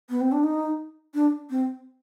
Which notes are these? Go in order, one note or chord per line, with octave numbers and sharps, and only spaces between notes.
B3
C4
D4
D#4
D4
C4